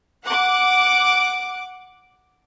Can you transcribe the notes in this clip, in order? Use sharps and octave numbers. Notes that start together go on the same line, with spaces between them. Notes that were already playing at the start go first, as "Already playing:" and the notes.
F#5 D6